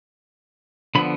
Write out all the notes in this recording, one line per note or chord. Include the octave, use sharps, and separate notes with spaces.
D3 F3 B3 B5